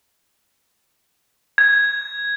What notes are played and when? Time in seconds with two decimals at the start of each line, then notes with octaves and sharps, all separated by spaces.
1.58 G#6